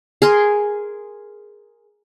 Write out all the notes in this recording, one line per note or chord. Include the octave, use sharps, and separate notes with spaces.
G#4 A#4 C6